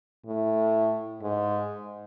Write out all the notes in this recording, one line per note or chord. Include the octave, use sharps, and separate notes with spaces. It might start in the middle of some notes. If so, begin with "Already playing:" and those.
A2
G#2